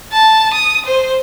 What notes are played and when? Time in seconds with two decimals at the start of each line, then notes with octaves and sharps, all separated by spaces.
0.12 A5
0.54 D#6
0.86 C5